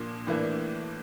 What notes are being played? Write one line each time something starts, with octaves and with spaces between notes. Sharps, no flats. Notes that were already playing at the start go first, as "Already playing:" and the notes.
Already playing: A#2 F3 A#3 D4
A2 E3 A#3 D4